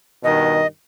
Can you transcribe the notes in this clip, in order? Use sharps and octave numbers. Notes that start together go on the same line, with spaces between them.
G2 B2 D#3 D#5